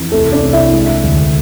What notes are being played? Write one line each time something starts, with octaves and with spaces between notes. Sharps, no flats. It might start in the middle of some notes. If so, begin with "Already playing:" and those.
Already playing: F2 E3
C2 A3 A4
D4 D5
C2
E4 E5
G#3
D2